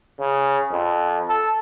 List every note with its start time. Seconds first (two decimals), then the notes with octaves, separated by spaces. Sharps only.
0.20 C#3
0.72 F2
1.29 A4